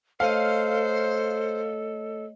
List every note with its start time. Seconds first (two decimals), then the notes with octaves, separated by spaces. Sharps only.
0.20 A3 A4 C5 C#5 D#5 F5